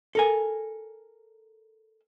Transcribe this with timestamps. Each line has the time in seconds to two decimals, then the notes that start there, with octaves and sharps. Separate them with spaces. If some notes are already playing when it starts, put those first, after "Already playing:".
0.15 A4 A#4 G#5